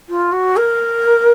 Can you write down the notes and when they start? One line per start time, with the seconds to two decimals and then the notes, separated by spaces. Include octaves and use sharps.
0.09 F4
0.32 F#4
0.56 A#4